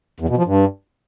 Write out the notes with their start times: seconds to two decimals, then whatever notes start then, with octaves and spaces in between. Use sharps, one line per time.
0.20 E2
0.29 B2
0.37 F3
0.46 G2